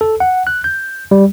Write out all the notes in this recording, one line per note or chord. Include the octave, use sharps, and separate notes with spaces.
A4
F#5
F#6
G6
G3